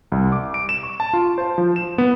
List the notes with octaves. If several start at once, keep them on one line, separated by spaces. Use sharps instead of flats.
C2
D6
D7
E7
C#6
A5
F4
C5
F3
E7
B3